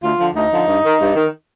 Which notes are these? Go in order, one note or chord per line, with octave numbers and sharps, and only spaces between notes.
D2 F4
D3 F3
D2 D#4
D3 F3
G2
D#3
G2
D#3